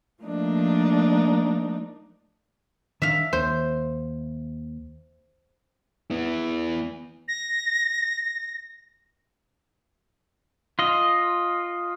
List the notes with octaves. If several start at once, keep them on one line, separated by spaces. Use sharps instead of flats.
F3 A3 A#3 D4 D#4
D#3 D4 E5 F5
D#2 C5
B3 E4
A#6
F4 D#5